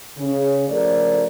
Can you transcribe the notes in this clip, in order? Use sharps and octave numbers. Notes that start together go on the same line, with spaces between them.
C#3
C#3 F3 A3 A4 A#4 D5